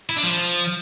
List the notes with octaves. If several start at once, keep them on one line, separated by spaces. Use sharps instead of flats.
E4
D4
F3